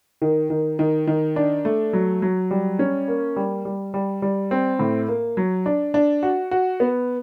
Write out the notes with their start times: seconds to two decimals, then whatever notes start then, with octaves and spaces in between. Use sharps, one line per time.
0.22 D#3
0.50 D#3
0.79 D#3
1.07 D#3
1.36 D4
1.65 A3
1.93 F#3
2.22 F#3
2.51 G3
2.79 C#4
3.08 A#3
3.36 G3
3.65 G3
3.94 G3
4.22 G3
4.51 C4
4.79 A2
5.08 A#3
5.37 F#3
5.66 D4
5.94 D4
6.23 F#4
6.51 F#4
6.80 B3